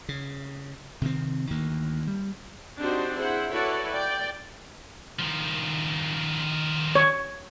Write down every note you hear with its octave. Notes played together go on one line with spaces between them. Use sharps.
C#3
C3 D#3 C4
D2 D#3 A#3
G3
C4 D4 D#4 F#4 G4 C5
E4 G#4 C5 F#5
E4 F#4 A4 B4 C#5 D5
D5 G5
D#3 F3
C#5